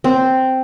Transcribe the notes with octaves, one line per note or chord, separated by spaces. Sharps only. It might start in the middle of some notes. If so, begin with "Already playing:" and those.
C4